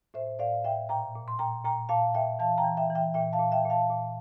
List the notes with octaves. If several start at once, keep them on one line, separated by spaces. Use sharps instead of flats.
A2 C5 E5
A2 D5 F5
A2 E5 G5
A#2 G5 A#5
A#2
C6
A#2 G5 A#5
A#2 G5 A#5
A#2 F5 A5
A#2 E5 G5
E3 F5 A5
G5 A#5
E3
E5 G5
E3
E5 G5
A#2 E5 G5
F5 A5
A#2
E5 G5
A#2
F5 A5
A#2